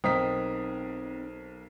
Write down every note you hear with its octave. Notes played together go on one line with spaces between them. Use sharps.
B1 C4 D#4 A#4 C5 G5 D#6 B6